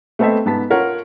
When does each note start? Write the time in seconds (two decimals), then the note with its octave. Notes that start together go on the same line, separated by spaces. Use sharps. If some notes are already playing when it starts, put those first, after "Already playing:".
0.19 A3 B3 C4 A4 D#5 E5
0.45 G#2 B3 A5 B6
0.70 F4 A#4 C#5 F#5